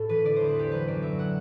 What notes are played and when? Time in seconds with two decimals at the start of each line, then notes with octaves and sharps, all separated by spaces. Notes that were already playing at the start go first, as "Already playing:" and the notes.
Already playing: A2 A4
0.09 E3 B4
0.25 D3 D5
0.36 E2 C5
0.48 B4
0.56 D3 G4
0.71 F#3 B4
0.87 F#2 D5
1.02 F#3 E5
1.19 F#5